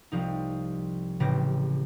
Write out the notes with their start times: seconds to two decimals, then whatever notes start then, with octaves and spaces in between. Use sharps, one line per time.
0.12 C2 F3 D#4
1.20 A1 C#3 G4 A#6